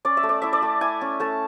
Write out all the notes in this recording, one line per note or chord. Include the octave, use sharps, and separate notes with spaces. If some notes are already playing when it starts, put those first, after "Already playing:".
C#4 D5
E5
A3
D5
E4 E5
D5
A3
E4 G#5
C#4
A3 A5